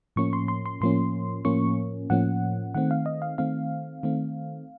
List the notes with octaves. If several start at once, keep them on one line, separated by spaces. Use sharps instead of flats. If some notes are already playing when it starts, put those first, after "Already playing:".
A2 F3 A#3 C#4 C#6
C6
C6
C6
A2 F3 A#3 C#4 C6
A2 F3 A#3 C#4 C#6
A2 F3 A#3 C#4 F#5
D#3 A3 C4 F#5
F5
D#5
F5
D#3 A3 C4 F5
D#3 A3 C4